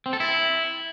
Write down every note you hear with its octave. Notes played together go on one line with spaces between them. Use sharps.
C4
A4
E4